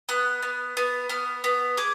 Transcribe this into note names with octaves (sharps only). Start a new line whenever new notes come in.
B3 F#6
B3
B3
B3 F6
B3
G#4 D6